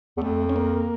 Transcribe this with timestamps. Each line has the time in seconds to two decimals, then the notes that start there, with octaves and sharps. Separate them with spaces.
0.17 E2
0.22 F2 A3
0.49 C#4
0.56 A#3